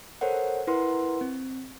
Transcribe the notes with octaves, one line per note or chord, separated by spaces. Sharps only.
A4 A#4 C5 C#5 F#5
E4 A#4 B4 F#5 C6
C4